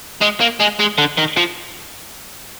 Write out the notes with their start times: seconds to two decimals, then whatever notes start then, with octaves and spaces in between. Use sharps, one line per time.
0.22 G#3
0.41 A#3
0.61 G#3
0.80 G#3
0.98 D3
1.17 D#3
1.37 F3